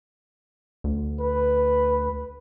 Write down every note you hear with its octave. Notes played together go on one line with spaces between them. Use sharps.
D2
B4